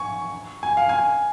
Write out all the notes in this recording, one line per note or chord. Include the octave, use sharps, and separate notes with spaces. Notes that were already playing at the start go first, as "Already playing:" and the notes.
Already playing: G#5 C#6
G#5
F5
G#5